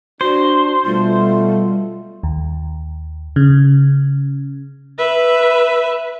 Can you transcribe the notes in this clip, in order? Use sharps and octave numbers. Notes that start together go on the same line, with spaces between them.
D4 F#4 C5
B2 G3 A3 F4
D#2
C#3
B4 E5